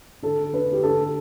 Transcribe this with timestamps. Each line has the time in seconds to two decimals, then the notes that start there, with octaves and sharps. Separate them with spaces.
0.22 D3 A4
0.53 D3 B4
0.73 G4
0.83 D3 A4